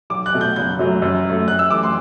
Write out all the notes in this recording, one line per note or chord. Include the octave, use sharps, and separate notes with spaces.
B1 D6
F#6
B2 A3
G6
F#1 G6
F#2 F#3 A3
F#2
F#3 A3
F#2 F#6
E6
E3 A3 D6
C6